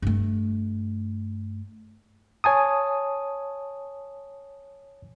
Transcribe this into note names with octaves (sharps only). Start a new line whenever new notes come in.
G2 A3
C#5 G#5 A5 D#6